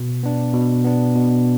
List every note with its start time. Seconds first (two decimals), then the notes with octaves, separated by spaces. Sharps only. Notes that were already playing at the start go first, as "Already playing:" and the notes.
Already playing: B2
0.23 B3 D4
0.53 B2
0.84 B3 D4
1.15 B2